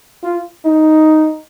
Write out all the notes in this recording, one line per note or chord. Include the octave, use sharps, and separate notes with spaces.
F4
D#4